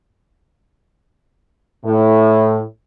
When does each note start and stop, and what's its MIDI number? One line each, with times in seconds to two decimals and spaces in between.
1.84 2.60 45